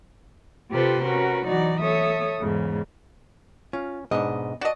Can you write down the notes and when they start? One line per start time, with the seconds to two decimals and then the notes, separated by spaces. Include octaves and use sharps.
0.70 C3 F4 G4 A4 B4 C5
1.04 C#4 F#4 A#4 B4
1.45 E3 F#3 D#4 F#4 D5
1.79 A4 C#5 E5 D#6
2.39 E2 G#2 C#3
3.73 C#4 F4
4.11 G#2 B2 B3 D4 D#5
4.61 F#4 D5 D#5 A5